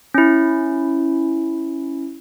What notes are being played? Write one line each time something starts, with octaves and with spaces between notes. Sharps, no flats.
C#4 E4